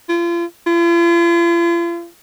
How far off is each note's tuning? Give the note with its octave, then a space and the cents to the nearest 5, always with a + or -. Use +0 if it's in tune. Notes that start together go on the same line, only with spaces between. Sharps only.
F4 -35
F4 -45